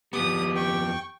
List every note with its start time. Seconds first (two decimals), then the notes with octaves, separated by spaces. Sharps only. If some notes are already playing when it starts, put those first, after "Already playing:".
0.13 F2 B3 G4 D#6
0.56 G5 C#6